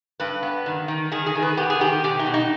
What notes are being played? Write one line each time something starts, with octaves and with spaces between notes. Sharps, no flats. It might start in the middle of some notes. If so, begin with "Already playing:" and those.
G2 B4
B3
D#3
D#3
D#3 G#4
G#4
D#3
B4
B3 G4
G#4
D#3 G4
B2 G4
D#4
B2
D#4